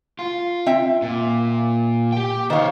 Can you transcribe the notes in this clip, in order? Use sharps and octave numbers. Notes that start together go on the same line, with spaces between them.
F4
C4 E5 G5
A#2
G4 G5
D#3 C5 C#5 F5